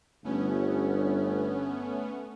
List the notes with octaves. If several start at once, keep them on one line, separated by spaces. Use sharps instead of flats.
G1 A3 B3 C#4